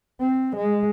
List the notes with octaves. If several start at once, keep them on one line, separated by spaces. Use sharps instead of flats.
C4
G#3